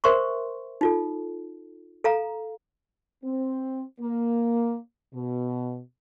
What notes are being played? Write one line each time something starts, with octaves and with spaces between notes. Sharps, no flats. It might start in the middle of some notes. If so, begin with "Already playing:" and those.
A#4 C5 E5 C6 C#6
D#4 F4 A4
A4 F5 A#5
C4
A#3
B2